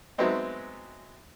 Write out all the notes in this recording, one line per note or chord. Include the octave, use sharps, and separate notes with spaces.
F#3 G#3 A3 B3 C4 D#4